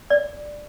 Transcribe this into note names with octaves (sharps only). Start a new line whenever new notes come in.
D5